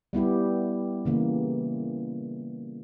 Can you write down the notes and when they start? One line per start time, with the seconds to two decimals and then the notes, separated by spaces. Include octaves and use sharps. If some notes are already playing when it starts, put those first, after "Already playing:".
0.13 G3 B3 E4 G4
1.05 C#3 E3 A#3